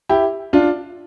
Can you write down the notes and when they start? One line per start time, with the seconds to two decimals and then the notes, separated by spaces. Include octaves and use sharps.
0.09 E4 G4
0.53 D4 F4